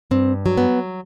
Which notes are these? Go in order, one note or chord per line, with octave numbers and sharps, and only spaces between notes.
G2 C4
F#3
B3